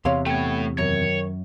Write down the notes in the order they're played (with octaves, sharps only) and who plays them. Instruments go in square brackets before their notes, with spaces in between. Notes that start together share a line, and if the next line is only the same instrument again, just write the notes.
[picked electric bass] E2 C3 [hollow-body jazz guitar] C#5 F5 C6
[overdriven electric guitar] A3 C#5 [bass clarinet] B3 [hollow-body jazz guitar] G5
[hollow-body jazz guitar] F#2 [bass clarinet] D#3 [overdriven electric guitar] C#5